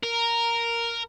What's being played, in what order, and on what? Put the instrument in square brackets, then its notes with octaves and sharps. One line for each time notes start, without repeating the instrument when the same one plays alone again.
[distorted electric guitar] A#4